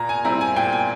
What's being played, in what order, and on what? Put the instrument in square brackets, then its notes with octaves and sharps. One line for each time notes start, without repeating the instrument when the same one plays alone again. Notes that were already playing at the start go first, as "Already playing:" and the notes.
Already playing: [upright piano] A#2 A#5
G#5
G3 C4 E4 A#5
G#5
A#2 G5
G#5